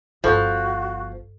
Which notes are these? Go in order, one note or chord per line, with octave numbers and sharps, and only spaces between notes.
G1 F3 F4 F#4 A4 C#6